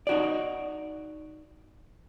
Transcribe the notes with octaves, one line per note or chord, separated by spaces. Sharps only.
D#4 F#4 D5